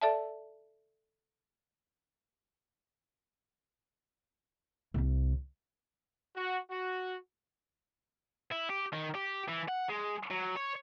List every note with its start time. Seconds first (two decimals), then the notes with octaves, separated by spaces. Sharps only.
0.01 A4 D5 E5 A5
4.94 C2 C3
6.36 F#4
6.71 F#4
8.52 E4
8.70 G4
8.93 D#3
9.15 G4
9.48 E3
9.68 F#5
9.89 G#3
10.31 F#3
10.57 C#5